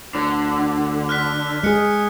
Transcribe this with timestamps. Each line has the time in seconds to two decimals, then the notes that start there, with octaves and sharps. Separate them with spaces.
0.15 D2 D3
1.09 F6 F#6 B6
1.64 G#3 G#4 F#6 C#7